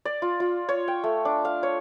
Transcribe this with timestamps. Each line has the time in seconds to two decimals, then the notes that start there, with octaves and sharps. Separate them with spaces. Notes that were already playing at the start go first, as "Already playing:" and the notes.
0.05 D5
0.22 F4
0.40 F4
0.69 C#5
0.88 G5
1.04 A3
1.25 D4
1.45 F5
1.63 C#5